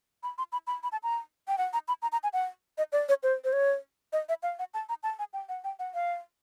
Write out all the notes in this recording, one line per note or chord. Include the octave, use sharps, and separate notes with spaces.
B5
C6
B5
B5
B5
A5
A#5
G5
F#5
A#5
B5
A#5
A#5
G#5
F#5
D#5
D5
C#5
C5
C5
C#5
D#5
E5
F5
F#5
A5
A#5
A5
G#5
G5
F#5
G5
F#5
F5